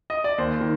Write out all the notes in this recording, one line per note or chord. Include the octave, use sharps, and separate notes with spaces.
D#5
D5
D#2 C5
D#3